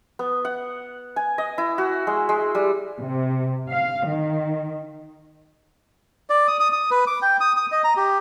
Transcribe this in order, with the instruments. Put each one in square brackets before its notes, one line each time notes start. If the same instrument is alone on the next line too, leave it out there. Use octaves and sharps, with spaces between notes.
[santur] B3
F#5
G#5
D#5
E4
F#4
G#3
G#3
G3
[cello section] C3
F5
D#3
[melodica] D5
D#6
D#6
D#6
B4
D6
G5
D#6
D#6
D#5
A#5
G4